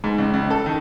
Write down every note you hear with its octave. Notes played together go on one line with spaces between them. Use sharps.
G#2
C#2
C#2
A4
D#3